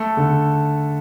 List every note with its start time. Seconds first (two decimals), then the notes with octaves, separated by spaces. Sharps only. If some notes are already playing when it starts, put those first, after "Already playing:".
Already playing: A3 A4
0.17 D3